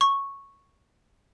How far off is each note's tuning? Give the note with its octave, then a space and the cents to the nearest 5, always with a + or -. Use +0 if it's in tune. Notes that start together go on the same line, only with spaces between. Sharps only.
C#6 -5